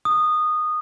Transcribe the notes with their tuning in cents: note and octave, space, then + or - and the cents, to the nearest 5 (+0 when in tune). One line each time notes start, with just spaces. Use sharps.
D#6 -15